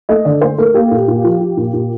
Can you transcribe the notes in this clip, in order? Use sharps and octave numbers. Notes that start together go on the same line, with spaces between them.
A3 D#5
D3 D5
A3 C5
A3 A#4
A#3 G4
A#2
A#2
F3
F3
A#2
A#2